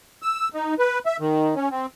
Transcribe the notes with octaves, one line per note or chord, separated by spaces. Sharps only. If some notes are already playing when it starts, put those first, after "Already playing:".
E6
D#4
B4
E5
D#3
C#4
C4